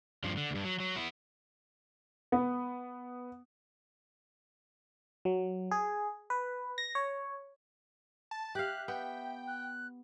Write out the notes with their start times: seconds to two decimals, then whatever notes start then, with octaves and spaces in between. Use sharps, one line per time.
0.24 G2 F3
0.37 D3
0.51 D2 G2
0.65 F#3
0.80 F#3
0.96 B3 E4
2.32 B3
5.25 F#3
5.71 G#4
6.30 B4
6.78 A#6
6.95 C#5
8.31 A5
8.55 G4 E5 F5 F#6
8.88 B3 G5
9.47 F#6